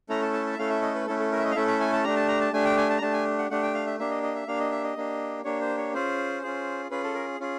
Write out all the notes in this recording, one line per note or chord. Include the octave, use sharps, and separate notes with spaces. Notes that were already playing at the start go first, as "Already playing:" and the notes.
A3 C#4 E4 A4 A#5
A5
A5
A5
E5
A3 C#4 E4 A4 F5
E5
D#5
B4
A3 C#4 E4 A4
A4
A#4
E5
D#5
F5
A3 C#4 E4 A4 E5
E5
G#5
A5
A3 D4 G4 A#5
A5
A#5
A5
A3 D4 G4 G#5
G5
G#5
A5
A#5
A3 D4 G4 A5
G#5
F#5
A3 D4 G4 F#5
G5
F5
E5
A#3 D4 G4 E5
D#5
D#5
E5
A#3 D4 G4 F5
D#5
E5
D#5
A#3 D4 G4
A#3 D4 G4 C#5
C5
C#5
C#4 F4 G#4 C5
C#4 F4 G#4
C#4 F4 G#4 B4
A4
A#4
C#4 F4 G#4